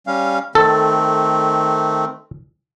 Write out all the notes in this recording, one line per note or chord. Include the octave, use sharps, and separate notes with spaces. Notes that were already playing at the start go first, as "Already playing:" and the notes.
G3 C#4 F5
D#3 A3 C4 A4